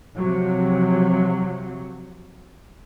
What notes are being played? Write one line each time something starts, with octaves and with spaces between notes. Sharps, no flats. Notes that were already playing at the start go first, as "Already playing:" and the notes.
C3 F3 F#3